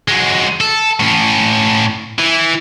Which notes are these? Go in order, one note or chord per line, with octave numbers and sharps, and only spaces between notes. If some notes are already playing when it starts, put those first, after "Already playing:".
F#3 G#3
A4
A2 C#4
E3